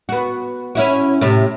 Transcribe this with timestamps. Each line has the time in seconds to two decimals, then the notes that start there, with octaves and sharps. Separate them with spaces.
0.09 B3 F#4
0.75 C#4 E4 F#4
1.21 A2 C3